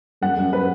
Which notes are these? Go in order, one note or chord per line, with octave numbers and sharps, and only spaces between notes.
F#2 F#5
F#2
B4